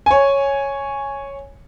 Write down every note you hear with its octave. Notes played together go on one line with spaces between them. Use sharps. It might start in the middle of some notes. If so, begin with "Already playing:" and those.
C#5 G#5